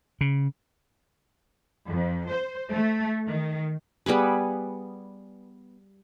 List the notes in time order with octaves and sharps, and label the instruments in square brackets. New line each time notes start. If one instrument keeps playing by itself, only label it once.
[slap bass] C#3
[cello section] F2
C5
A3
D#3
[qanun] G3 B3 G#4 B4